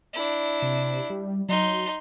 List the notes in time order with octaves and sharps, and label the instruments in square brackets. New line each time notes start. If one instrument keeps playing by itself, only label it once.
[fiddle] D4 E4
[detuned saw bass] C3
G3
[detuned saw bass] F#3 [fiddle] D#4 C6